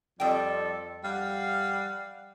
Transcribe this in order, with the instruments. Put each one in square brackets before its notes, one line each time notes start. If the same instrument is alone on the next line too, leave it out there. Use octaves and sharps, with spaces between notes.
[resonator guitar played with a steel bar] F2 G5 [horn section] F3 G3 A4
[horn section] G3 F5 F#5